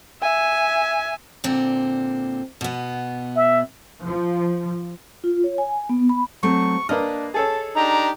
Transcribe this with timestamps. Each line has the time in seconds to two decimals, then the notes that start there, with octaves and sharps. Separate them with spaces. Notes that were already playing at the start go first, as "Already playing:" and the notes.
0.22 E5 G#5
1.44 A#2 D3 C4
2.61 B2 B3
3.37 E5
4.02 F3
5.24 F4
5.44 C#5
5.58 G#5
5.89 B3
6.09 B5
6.43 F#3 A3 C4 C#6
6.89 A#3 D4 B4 D#5 F6
7.34 G#4 A4 C#5 A5
7.75 D4 D#4 G4 A#5